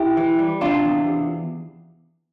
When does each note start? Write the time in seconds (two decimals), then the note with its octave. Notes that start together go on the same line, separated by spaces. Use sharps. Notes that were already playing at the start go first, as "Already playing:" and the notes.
Already playing: E4 G4
0.17 E3
0.39 G3
0.61 C3 D4 F4
0.85 E2
1.07 C3